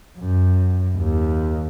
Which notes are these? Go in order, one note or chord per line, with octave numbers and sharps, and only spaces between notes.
F#2
D#2